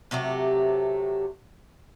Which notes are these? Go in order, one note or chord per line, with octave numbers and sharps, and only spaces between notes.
C3 F#3 A3 G4